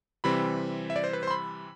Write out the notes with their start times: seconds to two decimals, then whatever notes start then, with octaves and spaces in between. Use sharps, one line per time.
0.24 C3 E3 G3 C4 B5
0.90 E5
0.96 D5
1.04 C5
1.13 B4
1.23 C5
1.28 C6
1.31 B5